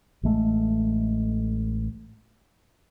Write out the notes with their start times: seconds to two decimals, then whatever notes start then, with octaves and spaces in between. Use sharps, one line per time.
0.23 A1 G#3 A3